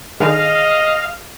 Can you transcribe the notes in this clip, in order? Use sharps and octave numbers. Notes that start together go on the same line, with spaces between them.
D3 D#3 D#4 G#4 D#5 F5